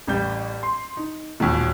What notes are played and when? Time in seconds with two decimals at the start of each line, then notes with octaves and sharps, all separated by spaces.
0.07 A1 G3 G6
0.63 C6
0.97 D#4
1.40 E1 D#2 A#2